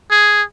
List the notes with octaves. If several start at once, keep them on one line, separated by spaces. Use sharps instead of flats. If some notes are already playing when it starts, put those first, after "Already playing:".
G#4